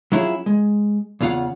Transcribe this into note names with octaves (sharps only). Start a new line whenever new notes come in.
F#3 C#4 E4 F4 G#4
G#3
E2 C#3 F4 F5 F#5